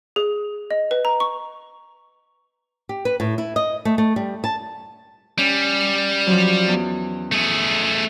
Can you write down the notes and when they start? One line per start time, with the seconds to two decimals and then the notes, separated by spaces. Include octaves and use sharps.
0.16 G#4
0.71 D#5
0.91 B4
1.05 A#5
1.20 C#6
2.89 G4
3.05 B4
3.20 A2
3.38 E4
3.56 D#5
3.85 A3
3.98 A3
4.16 G3
4.44 A5
5.38 G3 C#4
6.27 F3 F#3
6.68 E2
7.32 A3 G#4